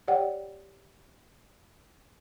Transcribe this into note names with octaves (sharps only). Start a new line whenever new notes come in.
G4 C#5 D5 F#5 G5